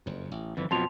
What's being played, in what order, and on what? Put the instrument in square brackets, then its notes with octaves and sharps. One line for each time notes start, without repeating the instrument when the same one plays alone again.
[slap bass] F#1 F2
A1
[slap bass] G1 [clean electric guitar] F2 E3
[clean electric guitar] F2 B2 F3 [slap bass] F#3 [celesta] A5 C6 F7